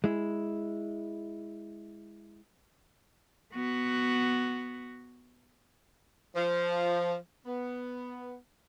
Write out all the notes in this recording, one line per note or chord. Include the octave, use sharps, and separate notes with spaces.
G#3 E4
B3 F#4
F3
B3